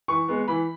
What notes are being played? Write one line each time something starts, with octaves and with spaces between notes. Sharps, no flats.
E3 C#6
G#3 B3
E3 B5